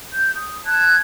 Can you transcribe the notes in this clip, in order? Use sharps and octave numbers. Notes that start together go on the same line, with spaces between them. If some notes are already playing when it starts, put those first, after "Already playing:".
G6
D#6
A5 F#6 G#6